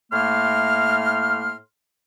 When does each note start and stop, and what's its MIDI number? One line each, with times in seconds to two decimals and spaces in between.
0.12 1.55 45
0.12 1.55 57
0.12 1.55 58
0.12 1.55 84
0.12 1.55 89